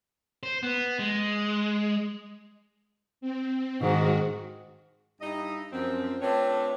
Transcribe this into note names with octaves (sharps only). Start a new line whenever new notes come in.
C5
B3
G#3
C4
G#2 D#3 F#4
G2 D#4 E4 D#5
F#2 F3 C4
A3 C4 D4 F4 B4 C#5